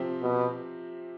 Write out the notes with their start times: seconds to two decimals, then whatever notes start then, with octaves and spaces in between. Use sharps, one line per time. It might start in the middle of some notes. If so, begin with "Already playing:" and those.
Already playing: C3 F3 C4 G4
0.22 B2